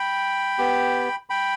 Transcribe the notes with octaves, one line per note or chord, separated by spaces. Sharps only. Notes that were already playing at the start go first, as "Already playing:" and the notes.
Already playing: G5 B5
B3 G4
G5 B5